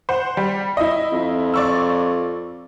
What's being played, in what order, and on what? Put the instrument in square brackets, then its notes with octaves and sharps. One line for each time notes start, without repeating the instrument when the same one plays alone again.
[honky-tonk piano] C5 F#5
G3
E4 D#5
[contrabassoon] F2
[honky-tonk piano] D5 C#6 E6